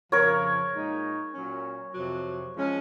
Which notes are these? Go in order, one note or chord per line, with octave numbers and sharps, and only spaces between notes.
F2 C#3 F3 A#4 C#5
A#2 G#3 D#4
A#2 F#3 C#4
F2 C3 F#3
F3 G#3 C#4